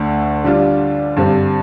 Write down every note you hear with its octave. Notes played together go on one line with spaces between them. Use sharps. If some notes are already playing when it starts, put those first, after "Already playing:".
Already playing: D2 D3 A3
D3 G3 D4 F4
G2 D3 G3 C4